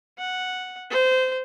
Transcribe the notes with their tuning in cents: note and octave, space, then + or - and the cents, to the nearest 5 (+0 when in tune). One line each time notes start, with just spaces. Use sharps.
F#5 -5
C5 -20